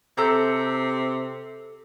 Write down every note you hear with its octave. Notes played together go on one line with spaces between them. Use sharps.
C3 A4 A#5 G6